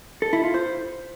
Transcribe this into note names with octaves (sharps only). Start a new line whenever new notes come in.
A4
E4
F4
C5